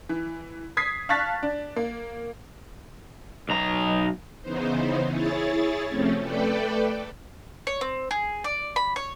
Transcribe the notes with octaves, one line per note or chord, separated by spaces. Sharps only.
E3
D#6 G#6 B6 C7
F5 A5 C#6 F#6 A6 B6
D4
A#3
B1 A#5
C#3 E3 B3 D#4 C5
E4 G#4 C#5 A6
C3 F3 A3 C4 C#4
A3 A4 B4 D5 G5
C#5
C4
G#4
D5
B5
C#5